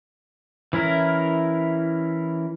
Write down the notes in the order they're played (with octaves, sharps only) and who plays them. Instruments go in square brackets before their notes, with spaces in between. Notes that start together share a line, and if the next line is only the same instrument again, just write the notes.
[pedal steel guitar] E3 C#4 E4 A#4